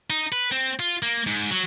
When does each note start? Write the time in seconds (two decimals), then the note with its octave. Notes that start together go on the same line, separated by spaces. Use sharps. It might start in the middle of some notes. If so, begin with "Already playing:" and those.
0.10 D#4
0.32 B4
0.51 C4
0.79 F4
1.02 A#3
1.27 G#2
1.50 F#3